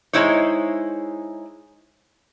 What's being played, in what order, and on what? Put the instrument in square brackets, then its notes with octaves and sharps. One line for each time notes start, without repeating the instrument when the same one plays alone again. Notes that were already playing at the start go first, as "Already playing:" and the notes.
[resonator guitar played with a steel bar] G#3 A3 D#4 E4 C5 C#5